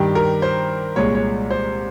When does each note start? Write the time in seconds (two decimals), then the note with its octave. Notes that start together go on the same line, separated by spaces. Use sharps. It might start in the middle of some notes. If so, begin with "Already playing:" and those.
Already playing: G2 D#3 G3 G4
0.15 A#4
0.42 C5
0.96 C2 A#2 G#3 C#5
1.15 C#5
1.51 C5